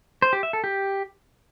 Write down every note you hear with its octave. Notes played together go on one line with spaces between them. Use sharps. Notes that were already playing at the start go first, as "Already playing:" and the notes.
C5
G4
E5
A4
G4